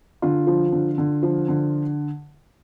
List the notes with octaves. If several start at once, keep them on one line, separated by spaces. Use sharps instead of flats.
D3 F4
F3
D3
D3
F3
D3